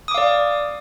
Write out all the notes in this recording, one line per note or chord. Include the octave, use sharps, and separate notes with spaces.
D5 F5 D6 D#6